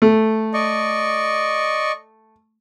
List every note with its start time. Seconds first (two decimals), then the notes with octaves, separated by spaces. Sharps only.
0.02 A3
0.54 D5 D#5 C#6